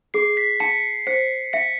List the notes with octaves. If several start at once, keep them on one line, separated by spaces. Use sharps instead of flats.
G#4 C7
B6
A5 B6 C#7
C5 B6 C#7
E5 B6 C#7